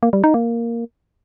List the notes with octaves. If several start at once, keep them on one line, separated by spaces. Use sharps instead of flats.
A#3
G3
D#4
A#3